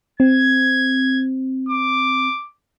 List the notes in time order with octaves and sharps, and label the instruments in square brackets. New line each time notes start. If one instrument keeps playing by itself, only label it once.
[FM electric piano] C4 [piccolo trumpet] G#6
[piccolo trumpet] D6